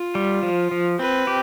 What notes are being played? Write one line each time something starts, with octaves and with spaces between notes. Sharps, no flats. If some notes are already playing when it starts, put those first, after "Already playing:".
Already playing: F4
G3
F3
F3
C4 B4
G4